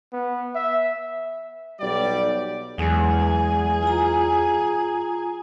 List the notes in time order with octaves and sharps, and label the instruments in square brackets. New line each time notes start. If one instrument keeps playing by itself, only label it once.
[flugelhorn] B3
E5
[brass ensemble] B1 G3 G4 D5
[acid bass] E2 [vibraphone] F#3 G#3 [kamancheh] G#4
[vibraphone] F4 A#5